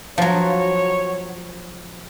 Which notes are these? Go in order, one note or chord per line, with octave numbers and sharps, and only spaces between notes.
F3 F#3 C#5